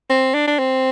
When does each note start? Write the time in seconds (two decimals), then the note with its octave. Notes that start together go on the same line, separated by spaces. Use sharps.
0.10 C4
0.34 D4
0.47 D4
0.59 C4